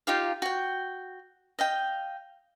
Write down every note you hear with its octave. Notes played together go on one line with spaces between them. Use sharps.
D#4 F4 G4 F5
F#4 G5
D#5 F5 G5